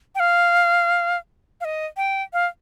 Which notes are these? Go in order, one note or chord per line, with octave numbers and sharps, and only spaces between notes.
G5
F5
F5
D#5
G5
F5